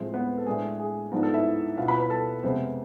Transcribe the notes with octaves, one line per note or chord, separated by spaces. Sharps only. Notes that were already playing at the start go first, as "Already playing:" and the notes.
Already playing: A2 F3 G#3 C4 C5
B3 B4
A4
A2 G#3 D4 G#4
G#4
G#2 F3 B3 D4
A4
E4 E5
B2 B3 E4 F4 F5
B4 B5
B4 B5
A4 A5
F2 C3 G#3 B3 C4 C5